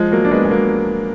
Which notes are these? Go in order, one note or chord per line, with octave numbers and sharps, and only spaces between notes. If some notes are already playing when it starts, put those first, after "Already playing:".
Already playing: F3 G#3
F#3 A#3
D4
G#3 B3
G#3
F#3 A#3